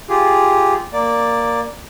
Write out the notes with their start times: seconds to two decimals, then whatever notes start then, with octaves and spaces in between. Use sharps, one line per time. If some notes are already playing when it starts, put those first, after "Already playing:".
0.09 F4 G4 G#4
0.93 A#3 D5